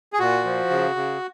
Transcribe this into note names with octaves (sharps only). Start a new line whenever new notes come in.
G#4
A#2 F#4
F3
C#3
C#3